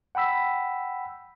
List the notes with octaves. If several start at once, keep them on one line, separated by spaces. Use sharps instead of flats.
F#5 G5 B5 E6 B6